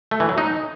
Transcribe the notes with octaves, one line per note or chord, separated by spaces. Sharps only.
A3
E3
F#3
D#4